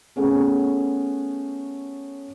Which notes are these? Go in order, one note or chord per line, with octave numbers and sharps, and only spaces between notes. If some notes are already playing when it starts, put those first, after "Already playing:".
A3 B3 C#4 G#4